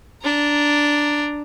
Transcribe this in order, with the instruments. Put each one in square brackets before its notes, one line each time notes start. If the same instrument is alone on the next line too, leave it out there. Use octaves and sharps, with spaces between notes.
[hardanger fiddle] D4 A#5